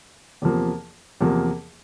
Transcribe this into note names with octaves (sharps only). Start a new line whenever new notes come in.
E2 C3 F3 A#3
E2 C3 F3 A#3